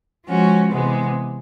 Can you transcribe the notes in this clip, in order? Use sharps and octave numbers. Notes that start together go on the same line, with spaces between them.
F3 G#3 C#4 F#4
C3 E3 G#3 B3